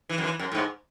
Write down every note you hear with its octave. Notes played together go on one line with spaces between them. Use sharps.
E3
F#2
E3
F#2
A2
G#2